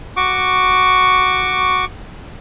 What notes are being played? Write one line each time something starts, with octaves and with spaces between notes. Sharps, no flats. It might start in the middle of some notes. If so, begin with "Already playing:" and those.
F#4 C#6 D6